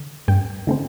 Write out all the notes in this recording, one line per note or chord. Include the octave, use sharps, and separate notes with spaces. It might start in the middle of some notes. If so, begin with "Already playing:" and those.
Already playing: D3
G2 G5
D3 A3 C4